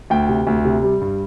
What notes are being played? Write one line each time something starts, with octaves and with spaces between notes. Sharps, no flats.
D2 G5
C3
D2
C3
G3
G2